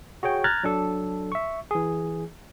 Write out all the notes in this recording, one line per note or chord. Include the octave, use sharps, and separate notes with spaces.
F#4 G#4 C#5 G5
A#5 F6 F#6 G#6 A6
F#3 D4 A4
E5 C#6
E3 G#4